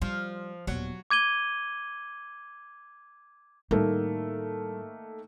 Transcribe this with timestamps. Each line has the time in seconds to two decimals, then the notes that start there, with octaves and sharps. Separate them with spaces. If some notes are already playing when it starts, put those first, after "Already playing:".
0.02 F3 G3
0.67 D#1 F#3 B3
1.10 D6 G#6 D#7 G7
3.71 A2 D#3 G3 A3 A#3